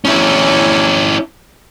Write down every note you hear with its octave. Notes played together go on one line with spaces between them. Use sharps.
E2 C#4 D4 E4 C#5